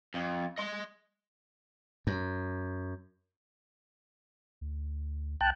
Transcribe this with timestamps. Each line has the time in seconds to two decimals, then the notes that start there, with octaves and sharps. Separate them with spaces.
0.14 F2
0.58 D#5 C6
2.07 F#2
4.61 D2
5.41 C2 G5 A5 F#6